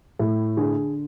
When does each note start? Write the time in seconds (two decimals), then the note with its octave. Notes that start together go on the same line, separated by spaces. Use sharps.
0.19 A2
0.57 D3 G#4